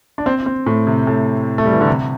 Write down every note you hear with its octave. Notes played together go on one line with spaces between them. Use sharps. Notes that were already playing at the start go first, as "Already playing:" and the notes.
D4
C4
C4
A2
C3
A2
A3
G3
E3
D3
C3